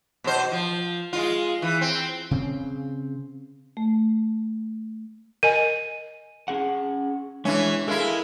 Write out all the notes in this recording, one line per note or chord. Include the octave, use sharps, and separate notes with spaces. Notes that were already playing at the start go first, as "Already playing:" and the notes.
B2 C5
F3
G#3 F4
E3
C4
C#3 C4
A3
A#4 D#5 G#5 D#7
C#4 G#4 F#5
E3 G#3 C#4 D4 E5
G#3 E4 A4 A#4 F5